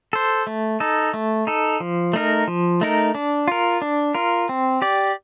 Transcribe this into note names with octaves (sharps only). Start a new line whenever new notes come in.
A4 C5
A3
D#4 A4
A3
D#4 A4
F3
A3 D#4 A#4
F3
A3 D#4 A#4
D4
F4 A#4
D4
F4 A#4
C4
G4 D5